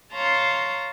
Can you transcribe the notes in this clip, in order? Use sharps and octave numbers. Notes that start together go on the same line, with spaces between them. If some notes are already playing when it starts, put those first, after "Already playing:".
C#5 F5 A5 A#5 C6